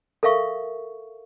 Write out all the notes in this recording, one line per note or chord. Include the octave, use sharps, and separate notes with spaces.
A4 A#4 E5 F5 C#6